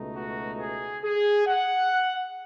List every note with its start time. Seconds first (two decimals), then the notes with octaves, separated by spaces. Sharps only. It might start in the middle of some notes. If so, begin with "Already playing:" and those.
Already playing: C#2 B2 A3 D#4
0.15 F#4
0.59 G#4
1.03 G#4
1.46 F#5